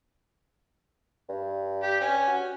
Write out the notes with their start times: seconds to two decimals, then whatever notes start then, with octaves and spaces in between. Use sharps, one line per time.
1.29 G2
1.83 G4
2.01 C#4 G#5
2.27 F#4